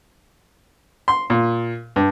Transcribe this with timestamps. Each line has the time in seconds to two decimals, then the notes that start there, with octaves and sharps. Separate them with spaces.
1.08 C6
1.30 A#2
1.96 G2